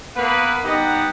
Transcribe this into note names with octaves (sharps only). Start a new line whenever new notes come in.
A#3 B3 B4
G3 B3 D#4 G4 D#5 F#5